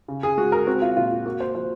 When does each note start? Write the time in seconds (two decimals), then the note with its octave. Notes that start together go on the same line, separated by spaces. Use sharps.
0.08 C#3
0.23 G#4
0.38 G#3 F#4
0.52 A#4
0.67 C4 F#4
0.82 F4
0.97 A#2 F4
1.11 F4
1.25 A#3 F#4
1.40 C5
1.55 F3 C5